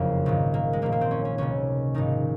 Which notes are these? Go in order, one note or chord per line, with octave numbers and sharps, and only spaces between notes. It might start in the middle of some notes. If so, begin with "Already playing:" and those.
Already playing: F#1 F2 C#3 A#3
A#1 G#2 D#3
A#3
G#3
A#1 A#2 A#3
A#3
C4
C#4
C#4
C#2 C3 D#3 C#4
A#1 G#2 D#3 D#4